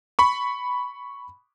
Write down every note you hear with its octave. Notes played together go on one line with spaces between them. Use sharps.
B5 C#6